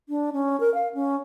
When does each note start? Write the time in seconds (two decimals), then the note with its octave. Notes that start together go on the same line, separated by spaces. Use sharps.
0.09 D4
0.33 C#4
0.60 A#4
0.74 F5
0.94 C#4